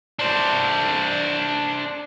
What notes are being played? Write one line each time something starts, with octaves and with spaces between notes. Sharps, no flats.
D4 C5